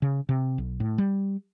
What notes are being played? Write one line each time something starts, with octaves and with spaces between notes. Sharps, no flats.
C#3
C3
B1
A2
G3